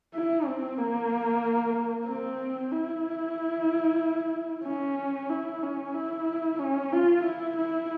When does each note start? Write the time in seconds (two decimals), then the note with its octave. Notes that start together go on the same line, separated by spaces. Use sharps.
0.15 E4
0.47 C4
0.79 A#3
2.07 C4
2.72 E4
4.66 C#4
5.30 E4
5.63 C#4
5.94 E4
6.59 C#4
6.92 F4
7.24 E4
7.57 E4